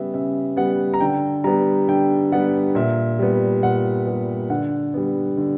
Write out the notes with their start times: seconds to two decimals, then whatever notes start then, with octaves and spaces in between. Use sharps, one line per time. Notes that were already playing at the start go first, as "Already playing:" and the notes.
Already playing: C#3 G3 B3 E5
0.14 C#3 E5
0.57 G3 B3 F#5
0.94 A#5
1.01 D3 G5
1.44 G3 B3 A#5
1.88 D3 G5
2.32 G3 B3 F#5
2.75 A#2 E5
3.19 G3 B3
3.63 A#2 F#5
4.07 G3 B3
4.50 D3 F#5
4.94 G3 B3
5.37 D3